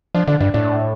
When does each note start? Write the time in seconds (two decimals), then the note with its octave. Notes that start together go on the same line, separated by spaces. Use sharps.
0.15 F3 D4
0.28 D3 D4
0.41 G2 D4
0.54 A2 D4